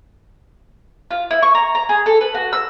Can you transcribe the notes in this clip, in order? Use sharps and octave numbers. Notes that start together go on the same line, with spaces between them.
F4
E4
C#6
A#5
A#5
G#4
A4
B4
F#4
E6